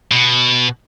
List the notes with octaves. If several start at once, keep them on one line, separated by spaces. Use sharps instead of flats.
B2